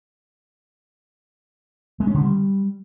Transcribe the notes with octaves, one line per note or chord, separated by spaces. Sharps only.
G#3
C#4
D3
G3